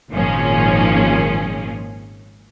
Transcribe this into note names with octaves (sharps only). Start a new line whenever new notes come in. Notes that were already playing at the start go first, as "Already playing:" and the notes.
G#1 A#2 D#3 F3 C#4 G#4